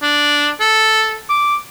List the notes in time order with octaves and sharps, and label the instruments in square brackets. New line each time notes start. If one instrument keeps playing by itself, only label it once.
[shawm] D4
A4
D6